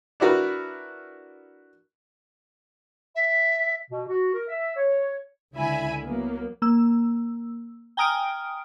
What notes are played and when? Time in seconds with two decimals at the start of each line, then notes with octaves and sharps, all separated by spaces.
0.20 D4 E4 F#4 A#4 B4
3.15 E5
3.90 B2
4.07 F#4
4.33 A#4
4.48 E5
4.75 C#5
5.54 C#2 D3 E4 E5 G#5 B5
6.04 F#3 A#3 B3
6.62 A#3 E6
7.97 G5 G#5 A#5 D#6 F6 D7